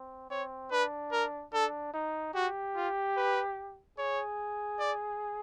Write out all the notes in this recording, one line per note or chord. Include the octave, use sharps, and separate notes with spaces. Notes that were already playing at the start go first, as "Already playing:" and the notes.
Already playing: C4
C4 C#5
D4 B4
A#4
D4 A4
D#4
F#4 G4
F4
B4
G#4 C#5
D5